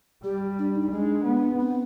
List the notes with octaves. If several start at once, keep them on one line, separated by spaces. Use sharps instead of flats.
G3 G4
D4
D#4
G#3 D4
B3
C4